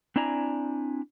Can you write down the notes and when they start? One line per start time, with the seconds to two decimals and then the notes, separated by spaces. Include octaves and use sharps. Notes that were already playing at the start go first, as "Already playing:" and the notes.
0.16 C4 D4 E4 D5 G#5 A#5